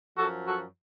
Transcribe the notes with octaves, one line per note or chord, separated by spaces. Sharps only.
F#2 F3 F#4 A4
F#4 A4